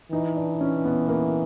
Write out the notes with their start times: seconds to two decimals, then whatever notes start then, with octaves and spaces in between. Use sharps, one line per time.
0.12 E3 D#4
0.36 D4
0.61 C#4
0.85 B3
1.08 A#3